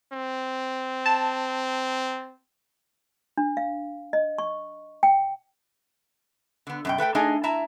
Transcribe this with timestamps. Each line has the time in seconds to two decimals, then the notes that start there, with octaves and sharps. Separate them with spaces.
0.12 C4
1.06 A5
3.37 D4
3.57 F5
4.13 D#5
4.38 C#6
5.03 G5
6.67 D3 B3
6.85 F#2 B2 G5
6.98 A3 B4 F#5 G5
7.15 A3 D4 D#4 G#4 D#5 G#5
7.44 E4 E5 A5 A#5